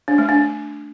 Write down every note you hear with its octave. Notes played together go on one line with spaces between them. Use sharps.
D4
A3
D4